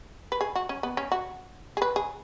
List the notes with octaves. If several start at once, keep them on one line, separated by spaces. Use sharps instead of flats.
B4
G#4
F#4
C#4
B3
C#4
F#4
G#4
B4
G#4